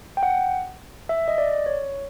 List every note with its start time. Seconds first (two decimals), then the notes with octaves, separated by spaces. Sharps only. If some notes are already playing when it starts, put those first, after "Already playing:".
0.17 G5
0.23 F#5
1.09 E5
1.28 D#5
1.38 D5
1.66 C#5